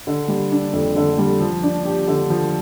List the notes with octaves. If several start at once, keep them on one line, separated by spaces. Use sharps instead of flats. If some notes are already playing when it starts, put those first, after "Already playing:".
D3
G3
D4
F2
D3
G3
F3
D4
G4
D3
F3